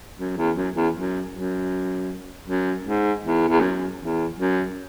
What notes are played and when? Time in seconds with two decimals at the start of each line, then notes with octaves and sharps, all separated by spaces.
0.19 F#2
0.37 E2
0.56 F#2
0.75 E2
0.95 F#2
1.33 F#2
2.47 F#2
2.86 G#2
3.23 E2
3.49 E2
3.60 F#2
3.99 E2
4.37 F#2